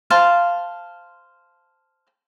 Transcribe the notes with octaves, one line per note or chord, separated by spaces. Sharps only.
C5 F5 A5